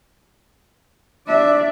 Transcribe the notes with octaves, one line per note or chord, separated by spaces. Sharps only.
D4 D5 E5